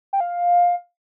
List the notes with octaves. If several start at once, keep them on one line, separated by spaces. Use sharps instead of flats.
G5
F5